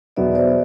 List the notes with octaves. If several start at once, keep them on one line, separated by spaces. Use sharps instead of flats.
E2 B2 F#3 B3 D5 E5
C5 D5